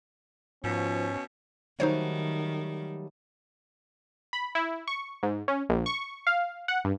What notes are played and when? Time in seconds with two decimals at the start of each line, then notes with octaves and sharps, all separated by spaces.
0.64 G#2 B2 F3 C#4
1.80 D#3 F#3 G3 A3 D#4 C5 C#5
4.33 B5
4.55 E4
4.88 C#6
5.23 G#2
5.48 C#4
5.69 A#1
5.86 C#6
6.27 F5
6.68 F#5
6.85 G2